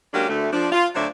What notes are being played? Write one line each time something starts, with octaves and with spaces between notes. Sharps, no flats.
F#3 G#3 A#3 C#4 D4 G4
D2 A3
F3 D4
F4
D2 F#3 C5 D5 E5